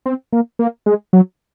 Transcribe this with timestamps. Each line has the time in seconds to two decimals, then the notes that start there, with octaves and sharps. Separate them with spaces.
0.06 C4
0.32 A#3
0.59 A#3
0.86 G#3
1.13 F#3